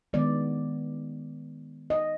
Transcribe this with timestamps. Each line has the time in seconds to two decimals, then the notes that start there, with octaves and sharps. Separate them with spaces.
0.13 D#3 G#3 B3 D5
1.90 D#5